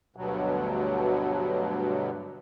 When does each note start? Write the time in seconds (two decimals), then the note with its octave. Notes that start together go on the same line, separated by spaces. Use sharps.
0.16 D2 G2 B2 F#3